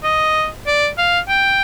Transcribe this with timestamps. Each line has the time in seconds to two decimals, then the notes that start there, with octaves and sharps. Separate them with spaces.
0.04 D#5
0.67 D5
0.98 F5
1.29 G5